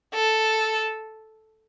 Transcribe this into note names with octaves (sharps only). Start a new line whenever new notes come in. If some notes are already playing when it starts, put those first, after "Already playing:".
A4